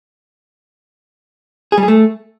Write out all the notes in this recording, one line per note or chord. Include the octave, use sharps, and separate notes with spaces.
G#4
G3
G#4
A3